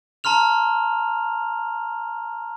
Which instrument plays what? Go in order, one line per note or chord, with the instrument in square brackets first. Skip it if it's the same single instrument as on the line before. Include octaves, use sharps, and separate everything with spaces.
[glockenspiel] A5 A#5 C6 F6 F7